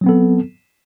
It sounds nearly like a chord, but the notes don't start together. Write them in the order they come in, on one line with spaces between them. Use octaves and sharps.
F#3 C4 B3 A4